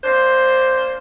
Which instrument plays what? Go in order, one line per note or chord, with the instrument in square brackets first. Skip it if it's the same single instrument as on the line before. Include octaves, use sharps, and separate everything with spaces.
[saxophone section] A#3 D4 C5